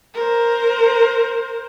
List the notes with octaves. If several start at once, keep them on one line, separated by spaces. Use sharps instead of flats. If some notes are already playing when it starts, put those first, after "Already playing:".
A#4 C5